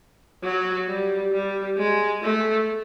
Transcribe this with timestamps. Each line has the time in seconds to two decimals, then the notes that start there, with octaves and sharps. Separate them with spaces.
0.43 F#3
0.88 G3
1.32 G3
1.78 G#3
2.22 A3